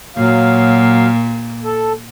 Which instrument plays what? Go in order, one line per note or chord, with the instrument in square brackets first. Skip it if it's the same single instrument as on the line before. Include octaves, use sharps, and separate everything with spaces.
[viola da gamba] A#2 [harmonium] F#3 F5
[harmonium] A4